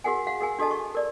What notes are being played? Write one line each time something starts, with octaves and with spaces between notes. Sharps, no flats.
F#4 G#4 A#4 F#5 G#5
F#4 F5 F#5
G#4 A#4 G#5
D4 F#4 A4 D#5 A5
C#6
A#4 D5